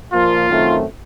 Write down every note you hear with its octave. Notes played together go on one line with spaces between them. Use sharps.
A#2 F3 A#3 F4
F#2 D#3 A3 C4